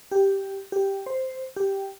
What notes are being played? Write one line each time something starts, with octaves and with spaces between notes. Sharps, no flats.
G4
G4
C5
G4